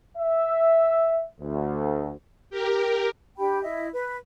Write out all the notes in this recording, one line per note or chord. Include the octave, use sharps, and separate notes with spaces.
E5
D2
G4 A#4
D4 G4 G5 B5
E4 D#5 E5
B4